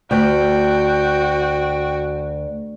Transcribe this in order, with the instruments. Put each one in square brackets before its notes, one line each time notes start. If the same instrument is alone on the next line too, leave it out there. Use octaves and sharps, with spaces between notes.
[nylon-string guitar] D2 [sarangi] F#4 [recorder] G5